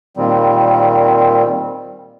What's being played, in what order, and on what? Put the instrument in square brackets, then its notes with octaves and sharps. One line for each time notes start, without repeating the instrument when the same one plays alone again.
[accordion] A#2 D#3 G3 C4